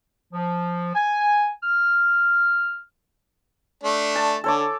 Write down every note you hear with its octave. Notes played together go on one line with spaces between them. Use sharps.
F3
G#5
F6
A3 D4
A5
D3 A4 C#5 D6